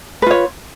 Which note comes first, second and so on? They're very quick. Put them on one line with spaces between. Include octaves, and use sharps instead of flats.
B4 F4 C#5